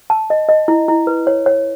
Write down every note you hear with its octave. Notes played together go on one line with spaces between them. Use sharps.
A5
D#5
D#5
E4
E4
B4
C#5
C#5